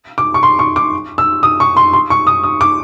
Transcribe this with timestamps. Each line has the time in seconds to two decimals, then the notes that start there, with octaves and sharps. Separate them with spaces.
0.18 D6
0.34 C#6
0.43 C6
0.59 C#6
0.76 D6
1.18 E6
1.43 D#6
1.60 C#6
1.76 C6
1.93 C6
2.10 C#6
2.27 D#6
2.44 D#6
2.61 D6